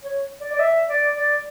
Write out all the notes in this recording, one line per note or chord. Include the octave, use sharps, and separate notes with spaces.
C#5
D5
D5
E5
D5
D5